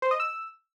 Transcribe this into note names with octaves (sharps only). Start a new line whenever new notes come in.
C5
D#5
E6